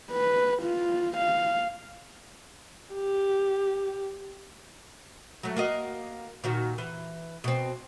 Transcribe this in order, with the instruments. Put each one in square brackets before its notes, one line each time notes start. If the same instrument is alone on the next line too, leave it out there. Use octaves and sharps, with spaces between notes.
[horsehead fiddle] B4
F4
F5
[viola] G4
[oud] F#3 A3
A#3 F#4 D#5
A#2 D#3 F#4
E3
B2 C4